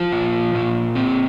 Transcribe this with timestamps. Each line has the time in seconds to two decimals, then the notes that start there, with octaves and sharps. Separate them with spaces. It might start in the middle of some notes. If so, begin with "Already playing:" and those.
Already playing: F3 F4
0.12 A#2
0.55 A#2
0.95 C4